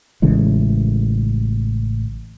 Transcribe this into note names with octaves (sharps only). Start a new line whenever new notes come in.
A1 C#3 E3 G#3